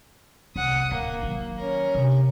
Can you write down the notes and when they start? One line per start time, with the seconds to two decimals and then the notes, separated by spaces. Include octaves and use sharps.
0.56 C2 F#5 D#6
0.92 D1 A#3
1.23 D#3 F#3
1.57 C#4 A#4
1.95 C3